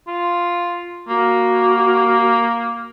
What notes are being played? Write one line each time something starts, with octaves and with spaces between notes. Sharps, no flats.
F4
A#3 F#4